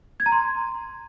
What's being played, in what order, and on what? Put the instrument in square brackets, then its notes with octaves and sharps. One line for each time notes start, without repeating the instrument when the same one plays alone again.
[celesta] G#6
A#5
C6